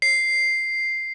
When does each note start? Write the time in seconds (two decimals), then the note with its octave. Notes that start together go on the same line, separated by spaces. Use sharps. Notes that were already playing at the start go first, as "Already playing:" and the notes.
0.02 C7